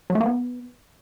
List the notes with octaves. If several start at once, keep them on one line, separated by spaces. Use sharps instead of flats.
F#3
A3
A#3
B3